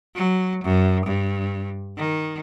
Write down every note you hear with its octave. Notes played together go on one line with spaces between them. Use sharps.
F#3
F#2
G2
D#3